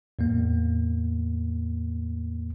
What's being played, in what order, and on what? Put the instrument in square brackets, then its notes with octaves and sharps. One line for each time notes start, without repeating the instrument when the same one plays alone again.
[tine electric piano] E2 A2 A#3